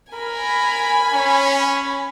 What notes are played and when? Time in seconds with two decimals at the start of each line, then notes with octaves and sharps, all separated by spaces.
0.13 A#4 G#5 B5
1.13 C#4